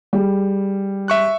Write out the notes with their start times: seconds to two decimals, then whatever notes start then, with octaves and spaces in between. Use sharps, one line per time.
0.13 G3 G#4
1.08 E5 C#6 F#6